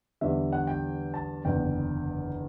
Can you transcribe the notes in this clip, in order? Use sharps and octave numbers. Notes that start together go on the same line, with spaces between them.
E2 D3 G3 E5
F#5
G5
A5
F#1 E2 D3 G5